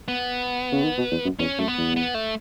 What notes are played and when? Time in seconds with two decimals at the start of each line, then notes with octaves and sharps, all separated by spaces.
0.08 B3
0.72 C#3
0.84 D#3
0.98 B2
1.11 E2
1.25 F#2
1.39 E2 C#4
1.58 F#2 A3
1.68 B3
1.78 E2
1.96 B3
2.14 A3